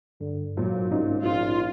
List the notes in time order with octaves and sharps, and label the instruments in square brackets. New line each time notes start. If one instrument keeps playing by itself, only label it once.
[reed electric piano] G2 [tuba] D3
[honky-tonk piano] G#1 A#2 [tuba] F#3
[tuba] C2 [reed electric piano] G#2 C#4 D#4
[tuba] A#1 [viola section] F4